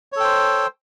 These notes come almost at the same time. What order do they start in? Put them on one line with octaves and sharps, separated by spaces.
C#5 A4 G5 C5